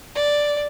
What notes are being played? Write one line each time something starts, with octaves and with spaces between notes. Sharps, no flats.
D5